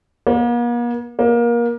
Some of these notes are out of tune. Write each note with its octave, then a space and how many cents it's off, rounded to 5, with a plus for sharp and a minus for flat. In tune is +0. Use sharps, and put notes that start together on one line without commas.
A#3 +45
A#3 +25